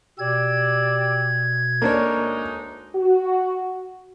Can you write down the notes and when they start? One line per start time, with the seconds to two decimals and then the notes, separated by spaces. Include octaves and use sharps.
0.19 B2 G4 D5 E6 G#6
1.82 D2 G#3 A#3 D4 D#4 C#5
2.95 F#4